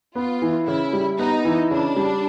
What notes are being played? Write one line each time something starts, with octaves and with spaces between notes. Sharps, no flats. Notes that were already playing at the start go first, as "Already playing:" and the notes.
B3 F4
E3
C#3 E4
G3
B3 D#4
E3
C#3 D4
G3